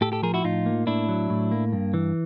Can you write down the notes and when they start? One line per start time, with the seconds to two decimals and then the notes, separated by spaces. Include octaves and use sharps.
0.01 A2 G4 A4
0.12 G4 A4
0.23 F3 G#4 A#4
0.34 E4 F#4
0.44 A2 D#4 F4
0.66 A#3
0.87 A2 D4 E4
1.09 F#3
1.30 A2
1.52 A#3
1.73 G2
1.94 E3